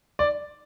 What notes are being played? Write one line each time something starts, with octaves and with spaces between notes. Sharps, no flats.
D5